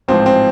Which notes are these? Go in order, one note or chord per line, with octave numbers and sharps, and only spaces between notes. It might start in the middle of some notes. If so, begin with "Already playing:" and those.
A1 G#2 F3 C4
C4